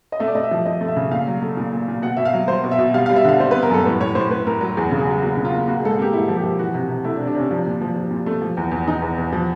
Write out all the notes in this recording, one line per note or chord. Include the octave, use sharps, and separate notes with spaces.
D#5
A3 E5
D5
A3 D#5
E5
F3
F3 D#5
A3
E5
C#3
A#2 F5
F#3
A3
A#2
A#2
A#2
B2 F#5
B2 E5
F5
F#3
F#3 C5
B2
E5
B2
G3 F5
F5
G3
E5
D3 F5
G3 C5
B4
B3
A#4
F#2 A4
A2 B4
A2 C#5
A2 C5
A2 B4
A2 A#4
F#3
E2 G#4
C#3
G#4
F#3
A#3 F#4
C#3
F4
A#3
A#3 F#4
G#4
G#2 A4
G#4
A#3 G4
G#2 E4
F3
G4
F3
E3 F#4
C3
C3
A3 E4
D4
C3
D4
C3 C#4
F3 D4
A#2
F3
F3
A#2
A3
F3
E2
E2
E2 D#4
E2
E2
F3